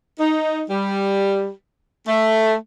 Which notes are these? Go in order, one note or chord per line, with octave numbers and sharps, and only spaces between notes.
D#4
G3
A3